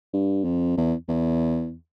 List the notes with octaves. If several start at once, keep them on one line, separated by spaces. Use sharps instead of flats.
G2
F2
E2
E2